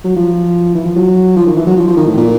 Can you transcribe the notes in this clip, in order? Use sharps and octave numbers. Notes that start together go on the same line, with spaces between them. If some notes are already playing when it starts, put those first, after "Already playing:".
F#3
F3
E3
F3
F#3
F3
D#3
E3
F#3
F3
F3
D#3
A2
A#2